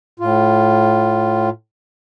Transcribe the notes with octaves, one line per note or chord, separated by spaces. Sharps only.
A2 F4